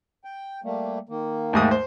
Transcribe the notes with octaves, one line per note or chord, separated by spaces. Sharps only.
G5
G3 A3 A#3
D#3 A#3
D#2 G#2 A3 D#6
C5